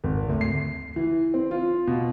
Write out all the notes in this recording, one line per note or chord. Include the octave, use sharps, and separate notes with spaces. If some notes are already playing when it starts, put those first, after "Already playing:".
G#1
D2
C7
E3
C4
F4
B2